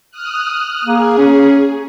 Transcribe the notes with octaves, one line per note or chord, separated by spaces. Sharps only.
D#6 F6 F#6
A#3 G#4
C#4